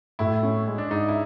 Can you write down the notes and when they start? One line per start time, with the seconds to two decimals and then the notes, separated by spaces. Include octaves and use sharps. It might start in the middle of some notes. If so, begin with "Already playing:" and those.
0.19 A2 E4
0.43 C#4
0.67 G#3
0.78 D4
0.91 G#2 D#4
1.08 E4